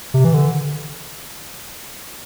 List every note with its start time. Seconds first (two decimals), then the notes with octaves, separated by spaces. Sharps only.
0.14 C3
0.24 E3
0.34 D3